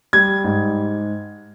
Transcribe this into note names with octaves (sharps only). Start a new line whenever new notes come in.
G3 G#6
G#2